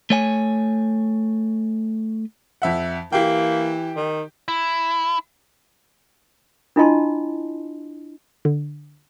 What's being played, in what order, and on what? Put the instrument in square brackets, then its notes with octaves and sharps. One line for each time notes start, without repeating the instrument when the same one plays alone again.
[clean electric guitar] A3 C#5 G#5
[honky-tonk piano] F2 E5 F#5
[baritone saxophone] E3 [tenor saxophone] A#3 [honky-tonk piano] G4 G5
[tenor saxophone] D#3
[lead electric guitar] E4
[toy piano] D4 E4 F4 D#5 A5 C6
[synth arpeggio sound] D3